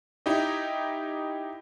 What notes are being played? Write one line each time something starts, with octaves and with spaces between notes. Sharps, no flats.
D#4 E4 G4 D#5